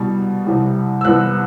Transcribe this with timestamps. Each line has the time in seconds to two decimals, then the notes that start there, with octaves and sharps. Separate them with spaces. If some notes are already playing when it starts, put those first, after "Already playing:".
Already playing: C2 B2 G3
0.46 C2 C3 E3 G3
1.01 E6
1.05 C2 C3 E3 B3 F#6